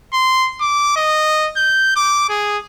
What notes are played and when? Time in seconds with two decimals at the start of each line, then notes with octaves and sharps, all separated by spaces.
0.13 C6
0.61 D6
0.96 D#5
1.57 G6
1.96 D6
2.29 G#4